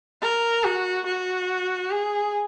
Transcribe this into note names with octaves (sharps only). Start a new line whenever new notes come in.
A#4
F#4
F#4
G#4